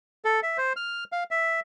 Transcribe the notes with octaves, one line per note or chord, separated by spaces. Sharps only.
A4
E5
C5
F6
F5
E5